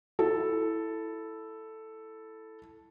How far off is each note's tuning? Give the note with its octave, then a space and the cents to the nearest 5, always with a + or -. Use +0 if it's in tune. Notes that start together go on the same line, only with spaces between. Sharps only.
E4 +0 A4 +0